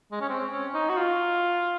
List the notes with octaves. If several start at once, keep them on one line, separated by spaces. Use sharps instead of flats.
G#3
C#4
C4
C#4
D#4
F#4
F4